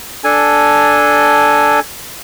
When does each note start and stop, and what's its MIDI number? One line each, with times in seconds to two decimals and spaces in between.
0.24 1.80 62
0.24 1.80 69
0.24 1.80 80